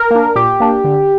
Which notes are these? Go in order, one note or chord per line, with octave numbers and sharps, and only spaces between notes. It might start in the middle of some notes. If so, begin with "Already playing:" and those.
Already playing: A#4
A#3 D4
A#2 G4
A#3 D4
D3